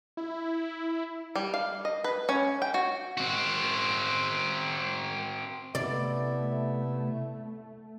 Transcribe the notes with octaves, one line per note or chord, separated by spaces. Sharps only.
E4
G3
F5
D#5
B4
C#4
G5
F#4
C4 F#4
C3 A3 B3 E4 D5 E5